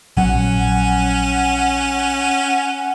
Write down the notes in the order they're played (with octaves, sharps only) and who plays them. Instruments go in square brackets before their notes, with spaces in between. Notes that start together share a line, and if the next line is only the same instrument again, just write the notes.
[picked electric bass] A#1 F#3 [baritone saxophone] C#4 [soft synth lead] F#5